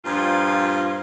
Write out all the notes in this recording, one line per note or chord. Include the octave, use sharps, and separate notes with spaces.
G2 A#2 F3 F4